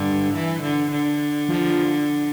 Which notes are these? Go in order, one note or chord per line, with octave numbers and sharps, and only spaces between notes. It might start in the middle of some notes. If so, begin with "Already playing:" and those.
Already playing: G2 D3
E3
D3
D3
F3